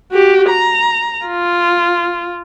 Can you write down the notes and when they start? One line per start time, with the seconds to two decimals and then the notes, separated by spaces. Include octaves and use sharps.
0.12 F#4 G4
0.50 A#5
1.26 F4